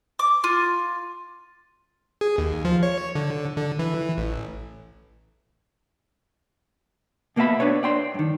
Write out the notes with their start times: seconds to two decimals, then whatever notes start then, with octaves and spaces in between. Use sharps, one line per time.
0.19 D6
0.44 F4
2.21 G#4
2.38 D#2
2.65 F3
2.83 C#5
3.15 D3
3.57 D3
3.79 E3
4.18 A1
7.36 B2 A#3 B3 A4 E5 B5
7.60 D4 B4 C#5
7.83 D5 G5 C6
8.14 G2 D#3